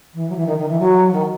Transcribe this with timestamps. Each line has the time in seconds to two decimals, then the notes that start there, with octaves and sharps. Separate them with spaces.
0.14 E3
0.29 F#3
0.35 E3
0.46 D#3
0.57 D#3
0.68 E3
0.79 F#3
1.13 D#3